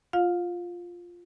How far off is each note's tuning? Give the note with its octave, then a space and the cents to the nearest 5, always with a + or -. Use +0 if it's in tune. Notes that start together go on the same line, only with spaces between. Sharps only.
F4 +0 F5 +30